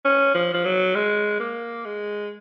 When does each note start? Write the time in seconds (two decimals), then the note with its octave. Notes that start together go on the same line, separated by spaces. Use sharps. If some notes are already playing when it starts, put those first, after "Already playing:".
0.05 C#4
0.35 F3
0.54 F3
0.65 F#3
0.95 G#3
1.40 A#3
1.85 G#3